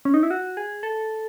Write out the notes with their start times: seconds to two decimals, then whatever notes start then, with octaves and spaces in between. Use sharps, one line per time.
0.05 C#4
0.14 D#4
0.23 E4
0.31 F#4
0.57 G#4
0.83 A4